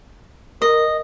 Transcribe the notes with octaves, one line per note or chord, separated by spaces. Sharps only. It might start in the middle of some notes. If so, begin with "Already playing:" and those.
A#4 D#5